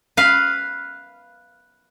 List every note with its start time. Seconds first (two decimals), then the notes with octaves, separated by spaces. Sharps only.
0.17 B4 F5